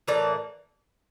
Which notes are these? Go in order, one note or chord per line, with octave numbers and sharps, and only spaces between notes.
A2 E3 A#3 D5